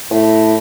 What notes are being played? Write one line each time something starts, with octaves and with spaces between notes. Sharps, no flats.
A2